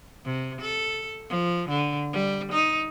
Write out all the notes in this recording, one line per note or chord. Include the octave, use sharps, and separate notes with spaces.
C3
A4
F3
D3
G3
D#4